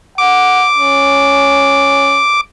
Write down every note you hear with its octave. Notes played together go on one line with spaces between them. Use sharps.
F#5 D6
C#4